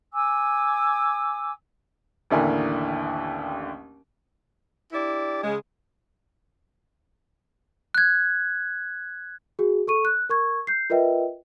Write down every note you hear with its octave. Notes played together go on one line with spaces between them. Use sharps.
G#5 D6 E6
A1 D#2 D3 E4 A#4 G#5
D4 E4 G4 D5
C#3 G#3
F#6 G#6
F#4 G#4
A4 C#6 D#7
F#6
A#4 C#6 G#6
G6 C7
F4 A#4 B4 D#5 E5 G5